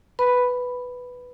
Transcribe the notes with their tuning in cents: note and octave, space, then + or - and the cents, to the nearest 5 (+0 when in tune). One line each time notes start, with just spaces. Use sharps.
B4 +5 B5 +0